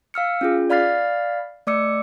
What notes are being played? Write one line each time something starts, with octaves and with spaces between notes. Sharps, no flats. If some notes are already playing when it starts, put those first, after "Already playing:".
F5 E6 F6 C#7
C#4 F4 G#4
D5 F5 B5 F6 A6 C7
A3 D5 D6 E6 C#7